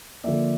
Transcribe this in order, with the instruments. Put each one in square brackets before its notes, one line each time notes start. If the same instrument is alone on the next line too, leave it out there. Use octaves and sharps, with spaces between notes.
[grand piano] D3 F3 A#3 D5 E5